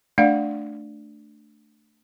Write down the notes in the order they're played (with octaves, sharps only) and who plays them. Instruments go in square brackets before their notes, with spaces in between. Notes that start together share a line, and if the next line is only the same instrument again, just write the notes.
[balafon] A3 D4 D5 F5 F#5